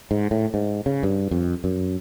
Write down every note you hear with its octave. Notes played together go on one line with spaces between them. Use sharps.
G#2
A2
G#2
C#3
G2
F2
F#2